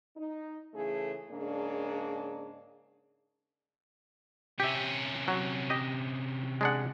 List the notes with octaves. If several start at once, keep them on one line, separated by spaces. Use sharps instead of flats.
D#4
C#3 E3 A3 G#4 A4
G#2 C#3 A#3 D4
C3 C#4 G4 E5
F#3
G4 D#5
G#3 D4 F#5